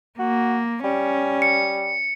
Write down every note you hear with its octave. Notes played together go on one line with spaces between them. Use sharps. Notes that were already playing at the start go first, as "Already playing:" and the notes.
A#3 F#4
G3 C#4
C#7